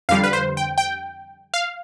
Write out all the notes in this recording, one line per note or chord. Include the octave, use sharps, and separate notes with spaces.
F2 D3 G3 F5
B4
C5
G5
G5
F5